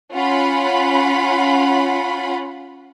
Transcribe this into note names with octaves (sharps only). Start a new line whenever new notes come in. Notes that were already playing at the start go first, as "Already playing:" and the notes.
C#4 F4 F#5 B5